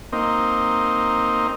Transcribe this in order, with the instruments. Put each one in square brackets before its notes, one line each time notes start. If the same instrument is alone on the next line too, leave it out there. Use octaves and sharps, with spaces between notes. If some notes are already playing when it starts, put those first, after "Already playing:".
[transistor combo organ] A#3 C4 D#4